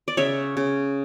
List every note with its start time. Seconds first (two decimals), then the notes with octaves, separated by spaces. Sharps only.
0.08 D5
0.17 C#3 C#5 E5
0.57 C#3